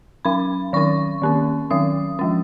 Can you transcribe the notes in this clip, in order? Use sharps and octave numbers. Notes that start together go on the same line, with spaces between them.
F#3 C#4 B5
D#3 F#3 C#4 C#6
D#3 A#3 C#4
D#3 F#3 C#4 D#6
F3 G#3 C#4